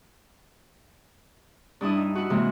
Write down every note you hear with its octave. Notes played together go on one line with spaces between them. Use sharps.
G2 D4 E4 D#6
D#4
E4 F#4
C3 E3 G#3 A#3